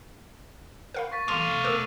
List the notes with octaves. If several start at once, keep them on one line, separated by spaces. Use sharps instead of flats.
A#4 F5 B5
C#6 A6 B6
E3 F#3 A3 F5 C6 D6 D#7
C3
B2 A#4 D6 E6